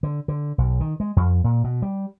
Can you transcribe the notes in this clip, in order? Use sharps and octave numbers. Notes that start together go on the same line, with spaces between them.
D3
D3
B1
D#3
G#3
F2
A#2
B2
G3